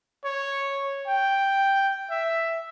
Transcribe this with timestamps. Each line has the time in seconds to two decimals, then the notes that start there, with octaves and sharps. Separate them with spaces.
0.25 C#5
1.08 G5
2.11 E5